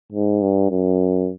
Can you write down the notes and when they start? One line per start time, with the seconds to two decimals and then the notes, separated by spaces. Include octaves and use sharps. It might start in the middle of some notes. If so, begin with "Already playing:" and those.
0.12 G#2
0.41 G2
0.70 F#2